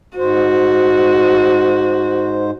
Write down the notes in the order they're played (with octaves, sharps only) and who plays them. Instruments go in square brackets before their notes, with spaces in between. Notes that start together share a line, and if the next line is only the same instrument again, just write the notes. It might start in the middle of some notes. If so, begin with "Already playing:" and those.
[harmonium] G#2 C5 [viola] F#4